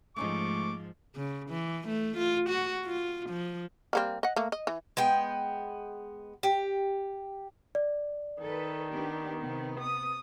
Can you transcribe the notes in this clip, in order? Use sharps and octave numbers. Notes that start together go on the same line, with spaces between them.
G#2 F3 A3 C#4 D#4 C#6 D6
C#3
E3
A3
F4
F#4
F4
F3
G3 A#3 C4
D#5 F#5
A3 A#3
D#5
E3
G#3 B3 G5
G4
D5
D#3 A4 B4
B3 D4 G4
C3 B3
D#6